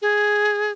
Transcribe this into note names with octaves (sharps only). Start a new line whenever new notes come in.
G#4